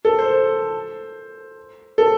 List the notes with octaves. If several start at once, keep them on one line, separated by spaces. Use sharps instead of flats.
A4
C5
A4